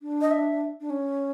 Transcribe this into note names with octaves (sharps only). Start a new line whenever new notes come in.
D4
D#5
E5
D4
C#4